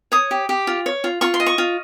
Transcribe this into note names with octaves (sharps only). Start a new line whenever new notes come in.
C#5 D#6
G4
G4
F4
C#5
F4
F4 C#6
C6
D#5
C#6
F4